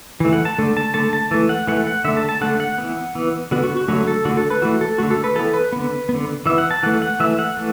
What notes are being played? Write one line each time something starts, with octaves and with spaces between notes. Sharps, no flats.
E3 A3
F#5
A5
D3 A3
A5
D3 A3 A5
A5
E3 A3
F#5
E3 A3 F#5
F#5
D3 A3 E5
A5
A5
D3 A3 F#5
F#5
E3 B3
E3 B3
D3 B3 F#4
F#4
F#4
D3 F#3 A3 F#4
A4
D3 A3 F#4
A4
B4
E3 A3 F#4
A4
D3 A3 F#4
A4
B4
E3 B3 A4
B4
D3 B3
B3
D3
E3 B3 E5
F#5
A5
E3 A3 F#5
F#5
E3 A3 E5
F#5
E3 A3